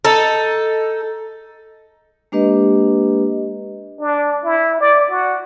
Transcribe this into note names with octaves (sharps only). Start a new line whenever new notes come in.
D#4 A4
G#3 A#3 D4 G4 B4 D#5
D4
E4
D5
F#4